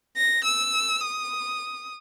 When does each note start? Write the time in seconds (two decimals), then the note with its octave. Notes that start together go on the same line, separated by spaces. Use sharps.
0.16 A#6
0.44 E6
1.01 D#6